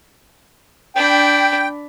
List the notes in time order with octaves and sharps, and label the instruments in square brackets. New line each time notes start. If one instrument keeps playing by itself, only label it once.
[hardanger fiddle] D4 B5 [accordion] G5